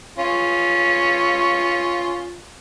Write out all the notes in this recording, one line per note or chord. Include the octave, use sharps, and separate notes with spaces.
C#4 F4